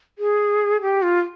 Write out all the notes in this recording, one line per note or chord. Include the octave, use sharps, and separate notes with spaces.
G#4
G4
F4